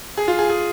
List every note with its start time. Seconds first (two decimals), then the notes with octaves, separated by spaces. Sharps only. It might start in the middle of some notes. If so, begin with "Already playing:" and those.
0.17 G#4
0.28 F4
0.39 G#4
0.49 G#4